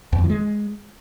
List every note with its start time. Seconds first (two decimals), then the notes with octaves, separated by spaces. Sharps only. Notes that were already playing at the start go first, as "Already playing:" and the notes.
0.13 E2
0.18 F2
0.24 E3
0.30 G#3